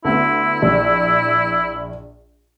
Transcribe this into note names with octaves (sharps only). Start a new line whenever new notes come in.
D2 B3 E4
A#1